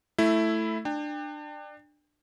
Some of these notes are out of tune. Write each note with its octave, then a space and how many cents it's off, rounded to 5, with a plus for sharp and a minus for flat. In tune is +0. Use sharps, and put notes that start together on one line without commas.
A3 +0 E4 +0
D4 +25 G5 +30